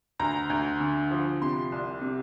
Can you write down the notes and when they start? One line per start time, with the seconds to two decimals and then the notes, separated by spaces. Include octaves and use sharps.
0.19 D2 A#5
0.50 D2
0.80 D3
1.11 F3
1.42 C3 C6
1.72 C2
2.01 C3